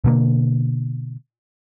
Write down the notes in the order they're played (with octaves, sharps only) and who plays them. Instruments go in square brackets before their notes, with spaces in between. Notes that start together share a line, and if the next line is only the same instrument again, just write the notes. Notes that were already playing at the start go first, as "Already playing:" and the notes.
[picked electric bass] B2 D3 A#3